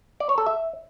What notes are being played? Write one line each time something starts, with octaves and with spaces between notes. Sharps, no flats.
D5
C#5
A4
E5